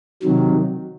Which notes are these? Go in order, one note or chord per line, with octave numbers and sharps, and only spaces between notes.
C3 D#3 F#3